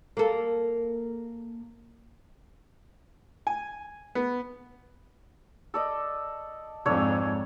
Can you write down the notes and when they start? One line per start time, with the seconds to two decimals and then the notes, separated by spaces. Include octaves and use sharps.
0.17 A#3 A4
3.47 G#5
4.15 B3
5.74 A4 D5 D#5
6.86 F2 G#2 D4 A4 C#5